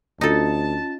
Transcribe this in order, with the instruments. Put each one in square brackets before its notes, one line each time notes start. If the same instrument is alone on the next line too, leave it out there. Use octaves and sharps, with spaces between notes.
[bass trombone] D2 [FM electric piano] C#4 F4 [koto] D#4 A4 [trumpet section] A5